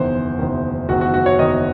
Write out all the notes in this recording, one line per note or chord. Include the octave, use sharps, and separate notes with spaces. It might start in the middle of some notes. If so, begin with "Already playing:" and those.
Already playing: F#1 E2 D#3 C5
F#1 E2 D#3
F#1 E2 D#3 F#4
F#4
F#4
C#5
F#1 E2 D#3 D#5